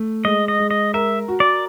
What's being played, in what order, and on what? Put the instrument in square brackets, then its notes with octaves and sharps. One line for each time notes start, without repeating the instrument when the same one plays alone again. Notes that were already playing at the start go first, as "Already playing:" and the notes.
Already playing: [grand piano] A3
[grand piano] G#3 [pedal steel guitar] D#5
[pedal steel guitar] D#5
[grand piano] G#3
[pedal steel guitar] D#5
[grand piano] A#4 [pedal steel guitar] E5
[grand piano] F#4
[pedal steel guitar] D5